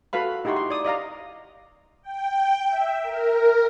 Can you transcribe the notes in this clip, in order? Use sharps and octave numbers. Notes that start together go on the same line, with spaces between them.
F#4 A4 B4 F5 B5
D#4 E4 G4 F#5 C6 C#6
C6
D5 D#6
D5 D#5 F5 A#5
G5
E5
A#4